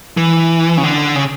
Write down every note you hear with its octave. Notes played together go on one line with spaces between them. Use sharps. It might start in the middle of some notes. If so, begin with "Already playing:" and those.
E3
C#3
D3
C#3